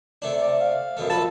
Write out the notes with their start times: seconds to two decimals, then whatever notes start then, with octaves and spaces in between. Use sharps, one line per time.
0.22 C3 A3 D4
0.42 D5
0.61 F5
0.97 F#2 B2 A3
1.10 A#1 A4 B4 A5